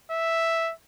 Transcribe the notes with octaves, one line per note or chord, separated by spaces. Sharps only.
E5